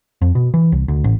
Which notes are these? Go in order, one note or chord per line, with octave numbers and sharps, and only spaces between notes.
F2
B2
E3
C2
D2
A1